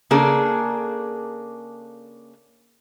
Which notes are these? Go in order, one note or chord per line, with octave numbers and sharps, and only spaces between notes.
C#3 A#3 D4 G#4 A4